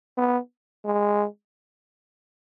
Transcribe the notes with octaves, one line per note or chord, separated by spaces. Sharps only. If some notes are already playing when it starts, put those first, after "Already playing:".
B3
G#3